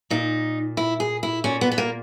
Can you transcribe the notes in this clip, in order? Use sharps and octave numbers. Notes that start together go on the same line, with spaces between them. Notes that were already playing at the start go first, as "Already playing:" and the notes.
A#2 D#4
E4
G#4
E4
A#2 C#4
B3
B3
A#3